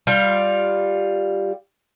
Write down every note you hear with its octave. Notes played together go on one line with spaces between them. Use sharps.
G3 F4